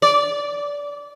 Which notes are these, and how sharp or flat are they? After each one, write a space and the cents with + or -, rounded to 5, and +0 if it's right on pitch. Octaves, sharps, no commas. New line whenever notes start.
D5 -20